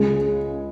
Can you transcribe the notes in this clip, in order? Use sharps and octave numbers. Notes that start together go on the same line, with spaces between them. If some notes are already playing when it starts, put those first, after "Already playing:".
Already playing: C#2 G#3 G#4
C#3